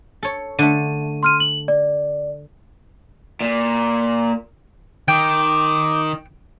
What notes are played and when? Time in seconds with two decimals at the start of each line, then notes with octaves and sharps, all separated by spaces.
0.23 A4 C#5
0.59 D3 A3 D#7
1.23 C6 F6 D#7
1.40 F#7
1.68 D5
3.41 A#2
5.08 D#3 G5 D6